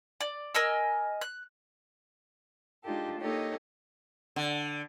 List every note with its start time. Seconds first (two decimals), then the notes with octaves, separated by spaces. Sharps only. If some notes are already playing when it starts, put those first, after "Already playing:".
0.21 D5
0.55 A#4 D#5 G#5 E6
1.21 F#6
2.84 G#3 D4 D#4 F4 G4 A4
3.20 A#3 D#4 G4 A4 C#5 D#5
4.36 D3